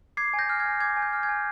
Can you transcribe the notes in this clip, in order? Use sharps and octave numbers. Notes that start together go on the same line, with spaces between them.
D6 G#6 C7
G#5
G6 A#6
F6
G#6
G#5
D6 G#6
G#5
G6
F6
G#6
G#5